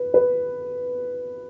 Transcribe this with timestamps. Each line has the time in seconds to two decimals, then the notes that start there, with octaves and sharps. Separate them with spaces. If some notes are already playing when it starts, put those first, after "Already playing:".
Already playing: B4
0.14 B4